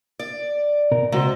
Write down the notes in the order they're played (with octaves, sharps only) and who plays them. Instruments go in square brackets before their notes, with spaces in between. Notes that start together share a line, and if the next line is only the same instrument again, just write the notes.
[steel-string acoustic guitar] D5
[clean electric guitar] B2 A#4
[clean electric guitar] C#2 F#4 C5 [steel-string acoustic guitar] C3